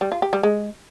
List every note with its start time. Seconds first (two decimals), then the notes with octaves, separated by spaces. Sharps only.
0.01 G3
0.12 F4
0.22 G4
0.33 G3
0.43 G#3